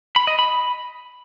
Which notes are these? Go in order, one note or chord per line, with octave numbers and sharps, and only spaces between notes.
B5
D#5
B5